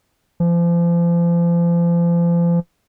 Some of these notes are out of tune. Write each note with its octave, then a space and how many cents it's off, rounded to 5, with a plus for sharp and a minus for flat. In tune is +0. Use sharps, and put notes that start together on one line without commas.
F3 -35